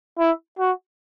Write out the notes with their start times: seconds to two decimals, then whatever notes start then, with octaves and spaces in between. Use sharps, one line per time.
0.19 E4
0.59 F#4